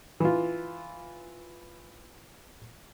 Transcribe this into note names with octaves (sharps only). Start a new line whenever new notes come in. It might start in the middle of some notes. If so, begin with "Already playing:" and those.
E3 F4